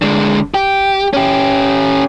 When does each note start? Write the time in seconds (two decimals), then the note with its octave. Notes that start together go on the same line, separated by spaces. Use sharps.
0.02 D3 G#3
0.54 G4
1.13 C#4 G4